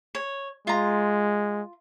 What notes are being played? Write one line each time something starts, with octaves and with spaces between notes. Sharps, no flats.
C#5
G#3 F4 A#5